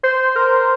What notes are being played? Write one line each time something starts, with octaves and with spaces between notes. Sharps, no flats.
C5
A#4